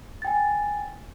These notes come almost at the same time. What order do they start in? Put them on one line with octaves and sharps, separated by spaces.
A6 G5 G#5